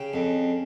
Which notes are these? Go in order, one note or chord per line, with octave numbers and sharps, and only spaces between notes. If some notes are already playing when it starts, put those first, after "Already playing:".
Already playing: C#3 G4
F2